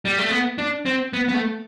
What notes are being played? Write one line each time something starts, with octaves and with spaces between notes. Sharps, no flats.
G3
A3
B3
D4
C4
B3
B3
A3